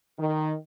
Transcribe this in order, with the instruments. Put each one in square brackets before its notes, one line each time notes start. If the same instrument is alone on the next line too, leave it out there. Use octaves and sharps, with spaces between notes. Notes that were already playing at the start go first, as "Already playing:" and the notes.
[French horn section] D#3